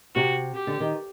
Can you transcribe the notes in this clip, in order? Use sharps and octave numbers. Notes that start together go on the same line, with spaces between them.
C3 F#4
G4
D3
D#3